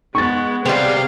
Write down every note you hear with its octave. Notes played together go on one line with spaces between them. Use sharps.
G#3 B3 C#6 A6
C3 G3 B3 C4 G#4 F5